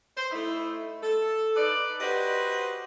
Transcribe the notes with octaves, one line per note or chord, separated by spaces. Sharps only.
C5
A3 D#4 E4
A4
D#4 B4 D5
F#4 G4 B4 C5 D#5